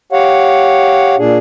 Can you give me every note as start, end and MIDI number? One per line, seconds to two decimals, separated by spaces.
0.12 1.15 67
0.12 1.15 73
0.12 1.15 77
0.12 1.15 78
1.18 1.38 46
1.18 1.38 62
1.18 1.38 68